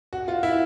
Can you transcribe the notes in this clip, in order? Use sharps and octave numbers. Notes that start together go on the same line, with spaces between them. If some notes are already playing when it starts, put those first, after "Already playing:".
F#4
F4
E4